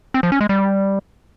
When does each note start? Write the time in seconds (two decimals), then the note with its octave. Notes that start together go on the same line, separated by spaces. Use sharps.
0.14 C4
0.23 F3
0.32 C#4
0.41 G#3
0.49 G3